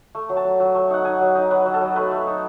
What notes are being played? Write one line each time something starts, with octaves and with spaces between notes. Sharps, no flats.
A3
F#3
A5
F#3
F#3
A3
D#4 F#5
D#4 G#5
F#3
D#4
F#3 B4
F#3
A4
F#3
A3 B4
A3
D#4